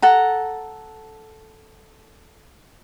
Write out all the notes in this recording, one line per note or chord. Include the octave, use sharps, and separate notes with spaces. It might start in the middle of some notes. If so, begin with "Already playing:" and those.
A4 F#5 A#5